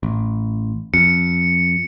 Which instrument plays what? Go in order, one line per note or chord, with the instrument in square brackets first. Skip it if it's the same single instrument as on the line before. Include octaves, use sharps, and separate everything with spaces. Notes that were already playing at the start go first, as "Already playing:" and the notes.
[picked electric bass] A1
[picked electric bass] F2 [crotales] C#7